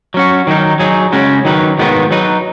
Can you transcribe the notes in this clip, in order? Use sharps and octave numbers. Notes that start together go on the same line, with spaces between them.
F#3 C#4 F#4
D#3 F#3 D#4
F#3 D#4 G#4
C#3 G#3 C#4 F#4
D#3 F#3 D#4 B4
D#3 G#3 B3 F#4 B4
F#3 D#4 B4